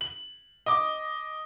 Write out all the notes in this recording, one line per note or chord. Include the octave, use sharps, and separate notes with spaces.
F#7
D#5 D6